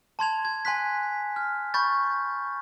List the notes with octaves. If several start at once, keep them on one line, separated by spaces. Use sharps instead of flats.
A5 C6 G#6 F7
G#6
G#5 C6 F#6 B6
F6
B5 C#6 G6 A6